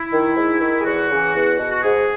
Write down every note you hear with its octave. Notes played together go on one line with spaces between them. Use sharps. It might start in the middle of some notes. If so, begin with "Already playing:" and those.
Already playing: E4
D#3
G#2
D#3
G#4
E2 F#4
C#3 E3
E2
B2
F#4
G#2 G#4